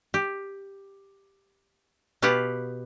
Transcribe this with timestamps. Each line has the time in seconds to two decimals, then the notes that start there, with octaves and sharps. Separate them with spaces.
0.14 G4
2.22 B2 B3 G4 F5 F#5